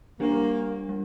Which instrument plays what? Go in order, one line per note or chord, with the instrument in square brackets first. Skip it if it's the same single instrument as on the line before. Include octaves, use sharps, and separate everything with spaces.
[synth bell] G3 D4 G4 [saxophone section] A#3
[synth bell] G3